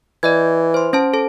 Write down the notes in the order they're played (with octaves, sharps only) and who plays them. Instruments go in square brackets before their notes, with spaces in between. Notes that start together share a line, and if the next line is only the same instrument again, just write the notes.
[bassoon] E3 [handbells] D5 D#5 G#6
[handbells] C5 C6
C#4 C5 A5
A4 A5